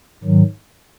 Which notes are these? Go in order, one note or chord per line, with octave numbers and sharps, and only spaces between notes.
G#2 D#3 F#3